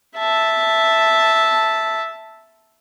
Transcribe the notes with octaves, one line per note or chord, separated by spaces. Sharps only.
E5 A5